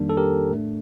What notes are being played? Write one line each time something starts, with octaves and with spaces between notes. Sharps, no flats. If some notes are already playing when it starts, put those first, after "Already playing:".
Already playing: F2 D#3 G3 A#3 D4
A4
G4 A#4
A2 A3 D4